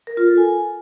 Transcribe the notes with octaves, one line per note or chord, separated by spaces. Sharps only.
A#4
F4
A4
G#5